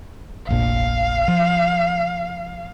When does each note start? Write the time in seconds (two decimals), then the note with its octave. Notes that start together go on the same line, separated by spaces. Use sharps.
0.49 F1 A#1 A#2 F5
1.28 F3